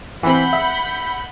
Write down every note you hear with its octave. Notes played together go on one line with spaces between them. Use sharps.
E3 C4 F#5 B5 G6
E5